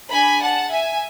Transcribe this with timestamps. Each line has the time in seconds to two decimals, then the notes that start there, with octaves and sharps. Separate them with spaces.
0.11 D4 G#4 G#5 B5
0.41 F#5 A5
0.71 E5 G#5